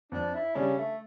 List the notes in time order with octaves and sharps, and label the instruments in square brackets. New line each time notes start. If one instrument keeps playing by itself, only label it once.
[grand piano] F2 [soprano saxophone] D4
[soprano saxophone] E4
[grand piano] C#3 G3 D4 [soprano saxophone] C#4
[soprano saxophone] A3